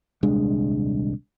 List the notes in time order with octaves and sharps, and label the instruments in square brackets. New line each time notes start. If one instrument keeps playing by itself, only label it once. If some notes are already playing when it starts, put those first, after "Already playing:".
[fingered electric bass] D#1 C2 G#3 D4